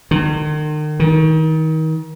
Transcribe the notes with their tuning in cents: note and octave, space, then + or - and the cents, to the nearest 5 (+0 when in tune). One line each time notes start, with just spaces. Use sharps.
D#3 -40
D#3 +30